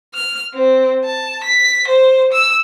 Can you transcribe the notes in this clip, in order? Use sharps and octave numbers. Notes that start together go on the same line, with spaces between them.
F6
C4
A5
B6
C5
E6